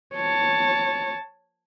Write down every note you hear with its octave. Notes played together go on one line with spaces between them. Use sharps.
C#5 A5